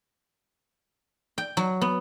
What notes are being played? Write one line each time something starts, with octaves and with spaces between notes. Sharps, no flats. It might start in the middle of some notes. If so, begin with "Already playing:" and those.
G5
F#3
B3